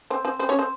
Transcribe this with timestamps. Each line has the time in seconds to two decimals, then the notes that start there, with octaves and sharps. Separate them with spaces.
0.10 C4 C5
0.25 C4 C5
0.39 C4 C5
0.49 C#4 C#5
0.59 C4 C5